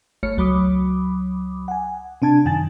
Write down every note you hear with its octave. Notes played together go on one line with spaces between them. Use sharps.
G#1 A3 C#5 F6 C#7
C#2 F#3 B5 D6 D#6
F#5 G#5
C3 D4 A5 G#6
F#2 D#3 G#5 A6